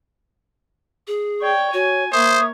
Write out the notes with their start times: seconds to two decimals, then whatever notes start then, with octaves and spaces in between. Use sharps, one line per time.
1.07 G#4
1.41 C#5 D5 G5
1.73 F#4 C#5 G#5
2.12 A#3 C5 C#5 E5 D#6